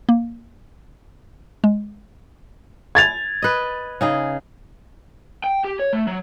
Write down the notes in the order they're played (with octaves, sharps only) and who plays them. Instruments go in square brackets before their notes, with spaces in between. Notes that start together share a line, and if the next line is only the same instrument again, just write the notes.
[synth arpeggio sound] A#3
G#3
[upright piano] G#6 A6 F7
[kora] B4 D#5
C#3 D#4 G#4
[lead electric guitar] G5
G4
C#5
A3
F#3